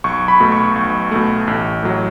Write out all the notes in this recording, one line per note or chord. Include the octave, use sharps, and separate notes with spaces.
B1 C#6
B5
B2 A3
C#6
B1
B2 A3
A1
A2 F#3